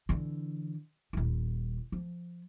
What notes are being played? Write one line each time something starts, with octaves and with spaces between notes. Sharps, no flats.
D3 E3
D#1 E4
F3